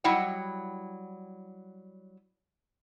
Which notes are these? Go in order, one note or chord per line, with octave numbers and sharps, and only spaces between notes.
F#3 G3 E4 D#5 F#5 G5